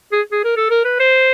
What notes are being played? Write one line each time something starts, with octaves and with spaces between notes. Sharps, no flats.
G#4
G#4
A#4
A4
A#4
B4
C5